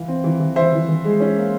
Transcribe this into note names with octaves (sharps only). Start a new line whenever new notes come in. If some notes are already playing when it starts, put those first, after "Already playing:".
Already playing: E3 F5
C4
E3
E3
E3 C5 E5
E3
E3
G#3
C#4
A#3